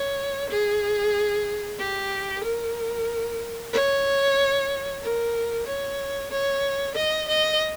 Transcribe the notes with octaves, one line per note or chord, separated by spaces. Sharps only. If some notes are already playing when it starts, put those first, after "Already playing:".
Already playing: C#5
G#4
G4
A#4
C#5
A#4
C#5
C#5
D#5
D#5